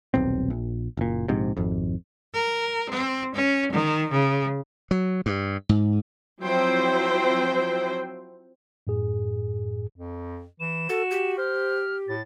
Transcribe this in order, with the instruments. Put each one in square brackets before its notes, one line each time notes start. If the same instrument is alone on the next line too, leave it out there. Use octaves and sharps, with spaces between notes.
[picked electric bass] D#1 B1 C4
A#1
F#1 A#2
A#1 G#2 C3
G#1 F2
[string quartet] A#4
C4
C#4
D#3
C#3
[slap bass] F#3
G2
G#2
[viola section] F3 F#3 C4 E4 C5 G5
[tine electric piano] F#2 A2 G#4
[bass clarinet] F2
[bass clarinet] E3 [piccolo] E7
[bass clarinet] F#4 [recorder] A4
[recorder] G4
[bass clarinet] C5 [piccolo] F6
[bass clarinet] A2 [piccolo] A6